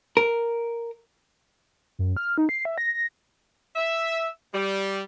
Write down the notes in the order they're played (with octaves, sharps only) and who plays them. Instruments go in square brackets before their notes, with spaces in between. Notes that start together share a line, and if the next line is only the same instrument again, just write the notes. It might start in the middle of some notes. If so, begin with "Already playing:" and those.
[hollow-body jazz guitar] A#4
[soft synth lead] F#2
F6
D#4
C7
E5
A#6
A#6
[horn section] E5
G3